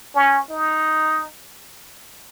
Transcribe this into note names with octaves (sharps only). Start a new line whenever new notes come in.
C#4
D#4